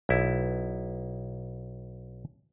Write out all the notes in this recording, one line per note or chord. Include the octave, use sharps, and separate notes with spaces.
B1 E4